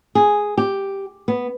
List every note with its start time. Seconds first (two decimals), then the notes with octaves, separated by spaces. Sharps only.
0.15 G#4
0.57 G4
1.28 B3